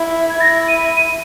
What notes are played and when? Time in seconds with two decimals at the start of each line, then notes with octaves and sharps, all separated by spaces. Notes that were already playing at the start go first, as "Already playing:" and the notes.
Already playing: E4
0.30 G#6
0.40 E4 A#6
0.68 D#7
0.96 D#7